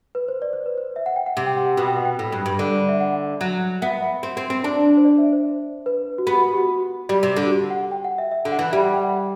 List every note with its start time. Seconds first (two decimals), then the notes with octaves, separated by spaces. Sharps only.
0.15 B4
0.28 C5
0.42 D5
0.53 C5
0.66 B4
0.78 C5
0.96 E5
1.06 F#5
1.16 G5
1.26 F#5
1.37 C3
1.47 G5
1.57 F#5
1.67 F#5
1.77 B2
1.87 G5
1.96 F#5
2.05 G5
2.19 A2
2.32 G2
2.46 G2
2.59 D3
2.89 E5
3.00 F#5
3.41 F#3
3.82 B3 E5
3.92 F#5
4.02 E5
4.23 C4
4.37 C4
4.50 C4
4.64 D4
4.97 C5
5.05 D5
5.18 E5
5.33 C5
5.86 B4
6.18 F#4
6.27 B3 G4
6.38 F#4
6.53 G4
6.58 F#4
6.69 F#4
7.09 G3
7.23 C3
7.36 D3
7.46 F#4
7.50 G4
7.70 F#5
7.91 G5
8.04 F#5
8.18 E5
8.32 E5
8.45 D3
8.52 F#5
8.59 E3
8.72 G3 E5
8.83 F#5
8.94 G5
9.03 F#5